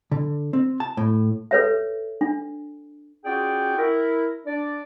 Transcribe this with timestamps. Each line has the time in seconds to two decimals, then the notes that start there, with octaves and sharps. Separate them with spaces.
0.11 D3
0.53 C4
0.80 A5
0.97 A2
1.51 A4 B4 C#5 E5
2.21 D4
3.25 C#4 F4 F#4 G#4 D5 G5
3.78 E4 A#4
4.46 D4 D5